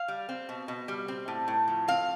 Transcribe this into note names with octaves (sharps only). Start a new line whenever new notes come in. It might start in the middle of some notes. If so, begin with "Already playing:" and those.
Already playing: F5
G3
C4
B2
B2
G3
C4
A2
A2
F3
C4 F5